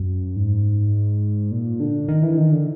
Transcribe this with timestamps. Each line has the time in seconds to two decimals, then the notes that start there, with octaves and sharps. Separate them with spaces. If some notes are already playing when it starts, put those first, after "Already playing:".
Already playing: F#2
0.36 G#2
1.51 A#2
1.80 D3
2.08 D#3
2.23 E3
2.37 D#3
2.52 D3